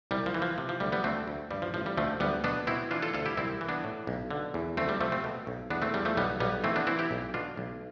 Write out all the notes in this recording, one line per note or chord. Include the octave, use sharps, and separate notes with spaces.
C2 G3
F3
E3
F3
C3
F3
D2 G3
G3 B3
D2 A3 C4
D2
G2 G3
F3
A1 F3
G3
D2 F3 A3
D2 G3 B3
B2 B3 D4
B2 C4 E4
E3 D4 F4
F4 A4
D2 F4 A4
E4 G4
C2 C4 E4
E3
B3 D4
A2
B1
D3
E2
D2 A3 C4
G3
C3 F3 A3
A3 C4
B2
B1
E2 B3 D4
A3 C4
E2 G3
F3 A3
B1 G3 B3
B1 G3 B3
E3 A3 C4
B3 D4
E3 C4 E4
E4 G4
B1
B2 D4 F4
B1